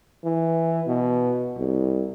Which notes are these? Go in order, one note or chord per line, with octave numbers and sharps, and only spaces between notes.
E3
B2
C2